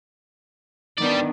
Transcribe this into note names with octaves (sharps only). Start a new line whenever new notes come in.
D#3 G3 B3 D4 D5